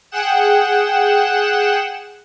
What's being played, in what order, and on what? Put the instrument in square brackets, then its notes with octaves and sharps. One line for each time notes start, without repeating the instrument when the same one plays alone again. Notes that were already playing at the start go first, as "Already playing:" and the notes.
[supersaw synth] G#4 F#5 G5 F#6 E7